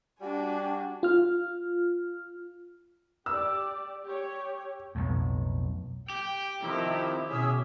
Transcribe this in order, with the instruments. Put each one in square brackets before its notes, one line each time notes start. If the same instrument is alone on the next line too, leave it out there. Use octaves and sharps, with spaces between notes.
[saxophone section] G3 F#4 [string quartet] D4 G5 G#5
[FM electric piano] F4 F6
[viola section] G4 D5 [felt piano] E6
[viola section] G4 C#5
[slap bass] B1 F2 A2
[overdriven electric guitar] G4 [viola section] G5
[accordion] C3 F3 [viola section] D#3 E4
[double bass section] B2 [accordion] C#4 G#4 [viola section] E5